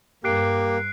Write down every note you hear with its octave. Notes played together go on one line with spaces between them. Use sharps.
G2 A#3 G4 F#6 C7 D7